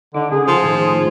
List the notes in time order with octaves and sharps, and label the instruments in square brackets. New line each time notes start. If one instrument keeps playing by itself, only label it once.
[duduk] D3 [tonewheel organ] D#4 D6
[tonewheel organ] C#3 A4 [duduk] G#4
[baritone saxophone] F3
[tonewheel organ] A2 D#3 C5